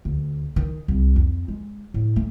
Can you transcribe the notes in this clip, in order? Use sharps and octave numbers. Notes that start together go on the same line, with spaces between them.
D2
D#3
C2
F2
G#3
A2
A3